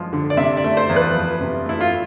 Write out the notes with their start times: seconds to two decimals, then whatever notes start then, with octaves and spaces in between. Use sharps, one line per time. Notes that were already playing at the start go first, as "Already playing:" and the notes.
Already playing: F3 G#3
0.13 D3
0.30 D5
0.37 C3 E5
0.57 D5
0.64 A3
0.77 C5
0.89 E2
0.96 B4
1.15 F3
1.40 C3
1.66 A3 E4
1.81 F4